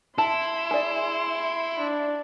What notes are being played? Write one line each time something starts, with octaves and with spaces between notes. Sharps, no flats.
E4 A5 C6
G#4 D5
D4